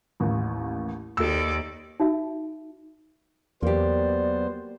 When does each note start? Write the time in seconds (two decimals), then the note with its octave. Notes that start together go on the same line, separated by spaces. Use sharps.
0.20 A1 D#2
1.17 D#2 A4 D5 E6
2.00 D#4 F#4 E5
3.63 E2 F#3 A#3 B3 G4 C5 D5